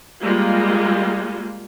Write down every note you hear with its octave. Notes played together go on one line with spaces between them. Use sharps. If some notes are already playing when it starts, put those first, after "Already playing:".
G3 G#3 A#3 F4